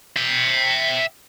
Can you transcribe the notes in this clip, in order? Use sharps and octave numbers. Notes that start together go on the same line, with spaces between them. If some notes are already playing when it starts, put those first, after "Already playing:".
E5 G5